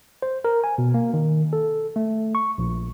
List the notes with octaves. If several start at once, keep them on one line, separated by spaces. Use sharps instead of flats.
C5
A#4
G#5
B2
A#3
D#3
A4
A3
C#6
A#1